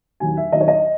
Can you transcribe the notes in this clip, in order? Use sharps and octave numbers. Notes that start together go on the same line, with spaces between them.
D#2 D#3 F#3 G#5
E5
D#2 D#3 F#3 D#5
C#5
D#5